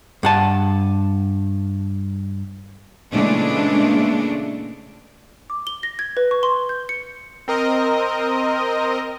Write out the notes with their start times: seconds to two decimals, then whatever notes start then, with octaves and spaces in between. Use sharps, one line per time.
0.23 G2 F#5 A5
3.12 A#2 C#3 E3 G#3 A3 D4
5.50 D6
5.67 G7
5.83 A#6
5.99 G#6
6.17 B4
6.31 C#6
6.43 C6
6.69 G6
6.89 C#7
7.48 C4 A#4 D#5